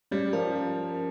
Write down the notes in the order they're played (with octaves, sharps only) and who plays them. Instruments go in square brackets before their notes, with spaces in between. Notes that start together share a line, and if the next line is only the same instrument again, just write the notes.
[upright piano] G3 [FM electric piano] C#4
[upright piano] F3 [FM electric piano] A#4